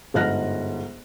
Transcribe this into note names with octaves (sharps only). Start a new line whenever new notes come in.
G1 G#2 F6 F#6 A#6